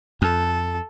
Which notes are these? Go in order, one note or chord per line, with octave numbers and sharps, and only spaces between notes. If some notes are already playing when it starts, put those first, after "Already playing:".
F2 A4